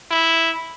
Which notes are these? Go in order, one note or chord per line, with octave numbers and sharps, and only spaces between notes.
E4